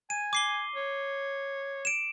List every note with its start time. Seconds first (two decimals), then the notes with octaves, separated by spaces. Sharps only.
0.10 G#5 D#7
0.33 D6 C7 G7
0.76 C#5
1.85 D7 E7